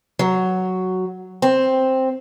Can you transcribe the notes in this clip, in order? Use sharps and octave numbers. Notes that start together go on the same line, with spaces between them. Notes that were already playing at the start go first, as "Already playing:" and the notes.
F#3
C4